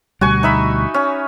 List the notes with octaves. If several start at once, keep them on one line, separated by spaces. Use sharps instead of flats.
D2 B2 G3 F#4 G#5 C#6
D#4 E5 B5
C#4